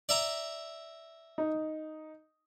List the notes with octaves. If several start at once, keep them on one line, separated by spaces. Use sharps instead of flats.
D5 E5 A#5
D#4